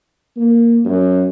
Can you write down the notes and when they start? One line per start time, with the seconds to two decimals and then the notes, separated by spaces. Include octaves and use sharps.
0.37 A#3
0.85 F#2